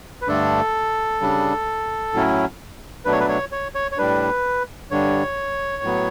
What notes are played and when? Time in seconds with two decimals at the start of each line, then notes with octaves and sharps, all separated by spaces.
0.22 B4
0.28 G2 D3 A3 D4 A4
1.21 C#3 G3 D4
2.13 A2 F#3 C#4 E4
3.05 B2 F#3 A3 D4 B4
3.12 C#5
3.20 B4
3.29 C#5
3.52 C#5
3.75 C#5
3.91 C#5
3.97 A2 G3 D4 B4
4.90 G2 D3 G3 D4 C#5
5.83 A2 F#3 B3